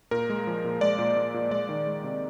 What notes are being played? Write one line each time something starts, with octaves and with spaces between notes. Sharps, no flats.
A#2 A#4
G#3
F3
A#2
G#3 D5
A#2
A#2
A#2
G#3 D5
D#3
G#3
C3